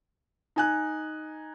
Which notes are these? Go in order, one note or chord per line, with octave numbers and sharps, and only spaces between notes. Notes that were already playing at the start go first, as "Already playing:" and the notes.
D#4 G#5 F#6